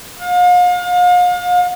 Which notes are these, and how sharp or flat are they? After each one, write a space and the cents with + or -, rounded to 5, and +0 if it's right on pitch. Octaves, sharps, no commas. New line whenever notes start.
F5 +40